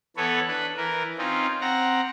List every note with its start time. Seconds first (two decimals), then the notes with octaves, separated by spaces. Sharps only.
0.17 E3 B3 A4 B4 C#5
0.48 D4 B4
0.77 E3 A#4
1.18 C4 C#4 D#4 F4
1.61 C4 F#5 A#5